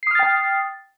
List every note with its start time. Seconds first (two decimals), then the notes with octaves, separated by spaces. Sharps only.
0.03 C7
0.07 D#6
0.11 F6
0.15 A6
0.19 G5